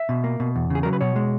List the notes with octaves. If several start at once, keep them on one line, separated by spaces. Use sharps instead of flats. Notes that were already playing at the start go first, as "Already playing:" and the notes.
Already playing: E5
B2
A#3
B2
E2
C#3 G#4
F#3 A#4
B4
B2 C#5
G#3